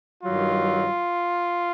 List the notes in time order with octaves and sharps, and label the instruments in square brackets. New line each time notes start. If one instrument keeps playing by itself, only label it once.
[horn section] G2 D#3 F#3 F4